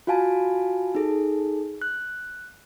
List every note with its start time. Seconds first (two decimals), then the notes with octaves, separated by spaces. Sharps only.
0.07 F4 F#4 F5 G#5 A5
0.95 D#4 G#4 A4
1.82 F#6